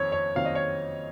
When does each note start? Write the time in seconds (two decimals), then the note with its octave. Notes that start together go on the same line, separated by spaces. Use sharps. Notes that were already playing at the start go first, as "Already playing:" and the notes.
Already playing: F#1 F2 D#3 C4 C#5
0.12 C#5
0.35 F#1 F2 D#3 F#3 C4 F5
0.45 D#5
0.55 C#5